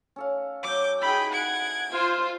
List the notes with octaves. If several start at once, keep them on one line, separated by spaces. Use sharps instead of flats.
C#4 A4 F5
F#3 D6 G6
D#4 E4 G#4 G5 B5
F#5 G#6 D7
F4 C5 C6